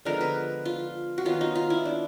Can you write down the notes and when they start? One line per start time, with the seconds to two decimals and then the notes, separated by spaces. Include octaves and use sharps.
0.05 D3 F3 G#3 B3 A#4
0.21 B4
0.65 F4
1.18 F#4
1.25 D#3 F#3 B3 F4
1.41 D#4
1.55 F4
1.70 E4
1.85 D4